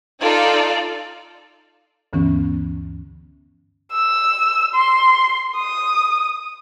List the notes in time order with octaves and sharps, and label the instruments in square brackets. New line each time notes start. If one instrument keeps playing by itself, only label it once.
[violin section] D#4 F4 A4 D5
[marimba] D2 G2 D3 E3 B3 C#4
[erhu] E6
C6
D#6